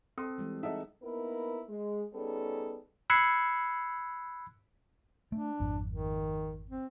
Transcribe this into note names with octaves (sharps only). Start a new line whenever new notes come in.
C4 A4 C6 D#6
E3 G3 G#3
D#4 G#4 A4 D#5 E5 F#5
A#3 B3 D#4 E4 A#4
G#3
G3 B3 C#4 D#4 G#4 A4
B5 E6 F#6 G#6 C7 C#7
A3 D4
G#1 F2
D#3
C4